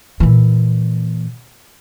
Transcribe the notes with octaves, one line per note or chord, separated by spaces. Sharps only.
A#2 E3